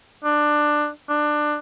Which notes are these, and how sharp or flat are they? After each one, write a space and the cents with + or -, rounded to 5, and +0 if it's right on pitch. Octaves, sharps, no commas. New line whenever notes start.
D4 +15
D4 +20